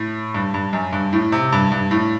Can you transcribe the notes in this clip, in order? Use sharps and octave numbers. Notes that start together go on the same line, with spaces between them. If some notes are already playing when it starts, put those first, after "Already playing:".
Already playing: A2
G2
G2
F#2
G2
A2
C3
G2
G2
A2